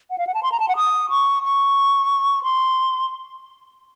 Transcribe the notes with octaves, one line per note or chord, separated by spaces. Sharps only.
F#5
F5
F#5
A5
C6
A#5
A5
F#5
D#6
C#6
C#6
C6